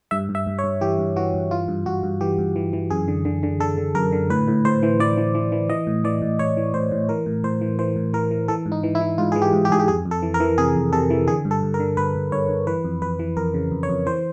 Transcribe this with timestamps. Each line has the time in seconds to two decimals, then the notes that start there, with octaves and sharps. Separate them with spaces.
0.11 G2 E5
0.29 G2
0.35 E5
0.47 G2
0.59 C#5
0.64 G2
0.81 E3 G4
0.99 G2
1.16 E3 F#4
1.34 G2
1.51 E3 F4
1.68 G2
1.86 G2 F#4
2.03 G2
2.21 E3 G4
2.38 G2
2.56 E3
2.73 E3
2.90 F#2 G#4
3.08 D3
3.25 D3
3.43 D3
3.60 D3 A4
3.78 D3
3.95 F#2 A#4
4.12 D3
4.30 A2 B4
4.48 A2
4.65 A2 C5
4.83 E3
5.00 E3 D5
5.17 E3
5.35 E3
5.52 E3
5.69 E3 D#5
5.87 A2
6.04 E3 D5
6.22 A2
6.39 A2 C#5
6.57 E3
6.74 A2 C5
6.91 A2
7.09 E3 A#4
7.26 A2
7.44 A2 C5
7.61 E3
7.79 E3 C5
7.96 A2
8.13 E3 A#4
8.31 E3
8.48 E3 A4
8.66 G#2
8.72 D#4
8.83 E3
8.95 E4
9.01 E3
9.18 G#2 F4
9.32 E3 G#4
9.42 G4
9.53 G#2
9.65 G4
9.70 G#2 G#4
9.79 G4
9.88 F2 G#4
10.05 F2
10.11 A4
10.22 E3
10.34 A#4
10.40 E3
10.58 C3 G#4
10.75 F2
10.93 C3 A4
11.10 E3
11.27 D3 G#4
11.45 G2
11.51 A4
11.62 G2
11.74 A#4
11.80 D3
11.97 G2 B4
12.15 G2
12.32 G2 C#5
12.49 G2
12.67 E3 B4
12.85 F2
13.02 F2 B4
13.19 E3
13.37 F2 A#4
13.54 C#3
13.72 F2
13.83 C#5
13.89 F2
14.06 E3 C5